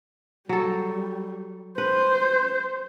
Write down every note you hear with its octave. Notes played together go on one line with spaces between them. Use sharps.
F#3 G3 A4
B4 C5